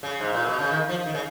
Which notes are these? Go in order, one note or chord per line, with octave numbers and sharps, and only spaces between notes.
C#3
G#2
A#2
B2
C#3
D#3
F3
D#3
C#3